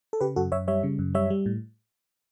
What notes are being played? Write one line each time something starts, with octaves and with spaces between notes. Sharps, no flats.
A4
C#3 G4 B4
F#2 F#4 A4
F#2 C#5 E5
G3 C#5 E5
C#3
F#2
G3 C#5 E5
G3
A2